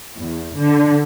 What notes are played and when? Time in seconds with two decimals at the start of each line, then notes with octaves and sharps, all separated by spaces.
0.19 E2
0.59 D3